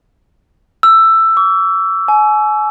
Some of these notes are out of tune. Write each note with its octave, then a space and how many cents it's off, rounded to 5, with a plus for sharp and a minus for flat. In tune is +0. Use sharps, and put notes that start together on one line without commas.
E6 +10
D6 -45
G#5 +35